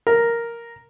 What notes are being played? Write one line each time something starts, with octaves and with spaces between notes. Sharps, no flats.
A#4